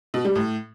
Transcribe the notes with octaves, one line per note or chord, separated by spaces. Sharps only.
B2
G3
A2